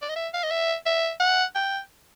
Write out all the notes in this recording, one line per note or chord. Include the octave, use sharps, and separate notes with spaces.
D5
D#5
E5
F5
D#5
E5
E5
F#5
G5